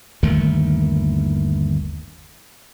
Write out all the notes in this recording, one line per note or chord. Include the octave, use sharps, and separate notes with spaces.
G1 D#2 D#3 A3